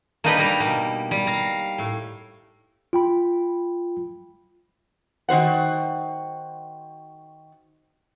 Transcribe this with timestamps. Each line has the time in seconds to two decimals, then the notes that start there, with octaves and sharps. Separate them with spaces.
0.24 A#3 D4 D#4 G4 B4 D#5
0.38 G3 A#3 A#5
0.60 B2 A#3
1.11 G3
1.27 F5 A#5
1.78 A2
2.93 F4 G5 B5
5.29 D#3 F#4 C5 F#5